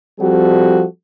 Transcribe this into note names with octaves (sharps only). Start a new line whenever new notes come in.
F3 G3 C4 F#4 A4